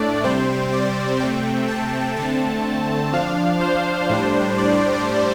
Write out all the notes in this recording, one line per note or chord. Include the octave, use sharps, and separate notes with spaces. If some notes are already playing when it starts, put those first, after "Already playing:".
Already playing: A2 A3 D4 D5
C3 G3 C4 C5
D5
C3 A3 C4 G5
A5
D3 A3 C4 A5
F3 D4 F5
C5
A2 G3 D4
D5